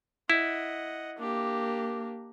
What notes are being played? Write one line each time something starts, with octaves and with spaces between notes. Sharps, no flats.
E4 D#5 F#5
A#3 D4 G4